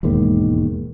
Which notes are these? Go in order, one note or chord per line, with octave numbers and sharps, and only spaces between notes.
E1 D#2 G#2 D#3